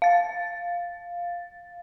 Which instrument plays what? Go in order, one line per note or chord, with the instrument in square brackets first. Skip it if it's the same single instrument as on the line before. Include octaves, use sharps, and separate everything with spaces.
[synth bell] F5 A6